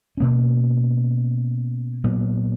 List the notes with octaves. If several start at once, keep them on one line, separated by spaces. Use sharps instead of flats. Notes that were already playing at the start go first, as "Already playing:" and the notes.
B2 A#3 C#4
A#2 F#3 B3